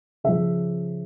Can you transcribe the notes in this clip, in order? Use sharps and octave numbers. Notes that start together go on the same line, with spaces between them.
C#3 F3 E5